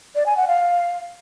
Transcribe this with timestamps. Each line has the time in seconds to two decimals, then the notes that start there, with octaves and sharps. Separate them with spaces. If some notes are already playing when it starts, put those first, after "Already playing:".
0.15 D5
0.26 G#5
0.37 F#5
0.48 F5